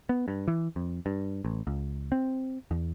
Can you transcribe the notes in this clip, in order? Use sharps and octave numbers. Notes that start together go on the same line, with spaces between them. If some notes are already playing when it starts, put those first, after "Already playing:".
B3
G2
E3
F2
G2
A1
C#2
C4
E2